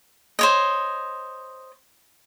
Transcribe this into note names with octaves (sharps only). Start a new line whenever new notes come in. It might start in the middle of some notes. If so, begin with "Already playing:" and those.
C5 C#5 D#5